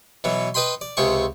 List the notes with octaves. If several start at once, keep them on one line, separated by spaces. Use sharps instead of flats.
B2 E3 F#3
B4 D#5 G5 B5 C6
D5
C#2 C3 G#4 G5 C#6